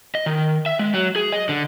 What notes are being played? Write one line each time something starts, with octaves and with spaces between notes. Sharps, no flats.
D#5
D#3
E5
G#3
F#3
G#4
D#5
D3